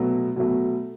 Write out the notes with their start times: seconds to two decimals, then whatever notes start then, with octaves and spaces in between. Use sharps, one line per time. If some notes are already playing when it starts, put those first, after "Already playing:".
Already playing: B2 F#3 A3
0.36 B2 F#3 A3